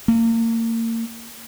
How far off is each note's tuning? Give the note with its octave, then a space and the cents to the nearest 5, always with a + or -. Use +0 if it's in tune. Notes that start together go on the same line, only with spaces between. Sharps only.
A#3 -35